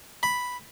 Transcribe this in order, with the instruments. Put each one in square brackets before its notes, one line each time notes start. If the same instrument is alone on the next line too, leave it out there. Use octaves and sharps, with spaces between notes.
[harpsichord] B5